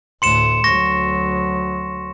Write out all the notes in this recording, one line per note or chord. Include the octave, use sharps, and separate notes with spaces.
D2 A2 C6 C#7 E7
D2 F#3 C#6 A#6